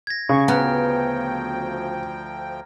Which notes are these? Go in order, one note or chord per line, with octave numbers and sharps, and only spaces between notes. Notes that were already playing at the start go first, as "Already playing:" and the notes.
G#6 A#6
C#3 C#6 C7
D2 F3 B3 G5 A#5 F6